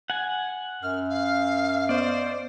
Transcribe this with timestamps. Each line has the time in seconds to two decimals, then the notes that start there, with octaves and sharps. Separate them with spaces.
0.10 F#5 G#5
0.83 F#2 F6
1.09 F5
1.89 B3 C5 D5 D#5